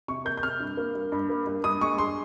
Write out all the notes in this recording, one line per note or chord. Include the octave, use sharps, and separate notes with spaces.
C3 C#6
A#3 G6
G6
C3 F6
G2
A#3
G2
G2
A#3
G2
G2 D#6
G#3 C#6
G2 C6